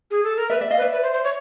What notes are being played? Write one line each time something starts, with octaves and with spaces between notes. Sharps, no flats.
G#4
A4
A#4
B4 D5 E5
D5 E5
D#5 F5
B4
D5 E5
B4
C5
C5
C#5